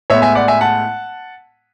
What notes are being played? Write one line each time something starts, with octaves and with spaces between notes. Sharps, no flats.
A2 G#3 B3 C#5 E5
E5 G#5
D5 F#5
E5 G#5
F#5 A5